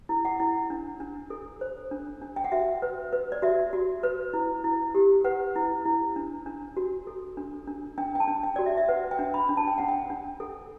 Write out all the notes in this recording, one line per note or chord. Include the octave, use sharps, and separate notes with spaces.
E4
F#5
E4
D4
D4
A4
C5
D4
D4
G5
F#5
F#4 E5
B4
B4
D5
F#4 E5
F#4
B4
E4
E4
G4
B4 F#5
E4
E4
D4
D4
F#4
A4
D4
D4
D4 G5
G5
A5
D4
G5
F#4 D5
E5
E5
B4 F#5
G5
D4
B5
D4
A5
G5
D4 F#5
G5
D4
A4